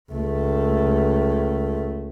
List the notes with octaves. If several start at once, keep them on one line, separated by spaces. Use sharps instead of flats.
C#2 A3